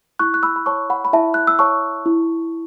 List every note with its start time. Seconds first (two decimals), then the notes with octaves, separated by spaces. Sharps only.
0.19 E4 C#6 F#6
0.34 F#6
0.43 B5 E6
0.56 B5
0.66 C#5 A5 C#6
0.90 F#5 B5
1.05 B5
1.13 E4 E5 A5
1.34 F#6
1.47 E6
1.59 C#5 A5 C#6
2.06 E4